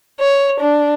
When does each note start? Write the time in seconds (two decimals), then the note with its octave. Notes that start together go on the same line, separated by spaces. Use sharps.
0.20 C#5
0.60 D4